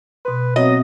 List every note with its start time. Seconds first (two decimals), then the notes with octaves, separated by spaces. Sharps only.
0.25 B2 B4 C6
0.56 F#3 B3 C4 D#5